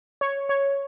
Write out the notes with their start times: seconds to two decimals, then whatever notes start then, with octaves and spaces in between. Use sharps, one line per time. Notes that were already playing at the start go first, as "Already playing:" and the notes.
0.21 C#5
0.49 C#5